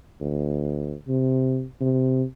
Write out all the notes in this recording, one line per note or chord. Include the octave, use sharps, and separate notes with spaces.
D2
C3
C3